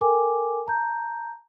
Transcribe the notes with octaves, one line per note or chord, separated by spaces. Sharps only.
A4 A#4 G5 G#5 D6
A5 A#5 G6